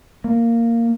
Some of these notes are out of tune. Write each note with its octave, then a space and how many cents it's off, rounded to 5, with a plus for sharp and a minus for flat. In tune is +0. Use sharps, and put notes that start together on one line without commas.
A#3 -10